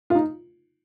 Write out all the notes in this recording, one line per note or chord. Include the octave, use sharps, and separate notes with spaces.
F4
D#4